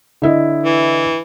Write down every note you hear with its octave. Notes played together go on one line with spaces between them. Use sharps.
D3 E4 D#5
E3